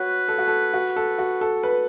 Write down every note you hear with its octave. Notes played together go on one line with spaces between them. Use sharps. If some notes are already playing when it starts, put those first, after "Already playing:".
Already playing: F#4 B4 C#5
A4
F#4
A4
F#4
A4
F#4
A4
B4